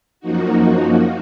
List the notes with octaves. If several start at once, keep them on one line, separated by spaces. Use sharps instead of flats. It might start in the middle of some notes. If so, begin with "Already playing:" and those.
F#2 F3 A#3 D#4 F#4